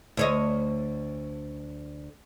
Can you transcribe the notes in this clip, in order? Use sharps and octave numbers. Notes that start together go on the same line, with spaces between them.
D2 C#5 D#5